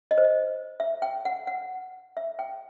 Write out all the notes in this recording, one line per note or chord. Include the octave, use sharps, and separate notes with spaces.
D#5
C5
D#5
E5
G5
F#5
F#5
E5
G5